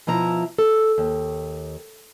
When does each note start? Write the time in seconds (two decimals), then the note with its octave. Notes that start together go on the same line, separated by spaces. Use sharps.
0.07 B2 F3 E4 A#5
0.58 A4
0.98 D#2